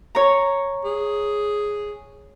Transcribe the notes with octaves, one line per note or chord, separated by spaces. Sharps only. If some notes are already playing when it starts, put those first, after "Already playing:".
C#5 A#5
G#4